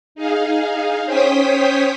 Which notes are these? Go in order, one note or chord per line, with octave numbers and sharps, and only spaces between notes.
D#4 G#4 F5
C#4 C5 C#5 G5 D#6 B6